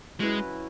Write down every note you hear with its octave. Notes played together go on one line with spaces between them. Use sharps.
F#3 G#3 C#4 E4 B4